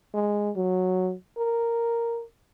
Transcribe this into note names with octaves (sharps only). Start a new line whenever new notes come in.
G#3
F#3
A#4